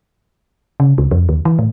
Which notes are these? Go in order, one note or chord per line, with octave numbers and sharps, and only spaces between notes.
C#3
C#2
F2
D#2
E3
A2